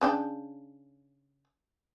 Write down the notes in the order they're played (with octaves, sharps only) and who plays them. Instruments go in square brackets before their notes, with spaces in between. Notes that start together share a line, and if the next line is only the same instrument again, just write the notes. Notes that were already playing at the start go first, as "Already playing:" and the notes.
[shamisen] C#3 D4 G5